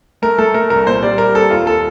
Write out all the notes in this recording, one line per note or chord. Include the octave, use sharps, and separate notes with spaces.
A3 A#4
A3 A4
A3 A#4
C2 A#4
A#2 C5
G3 D5
G3 A#4
C4 A4
D#2 F4
A4